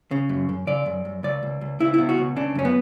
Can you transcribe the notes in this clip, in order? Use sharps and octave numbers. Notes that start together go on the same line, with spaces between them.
C#3
F#2
F#2
C#3 D5
F#2
F#2
C#2 D5
C#2
C#2
C#2 E4
B2 E4
F#4
C#2
C#3 D4
F#2 C#4
B3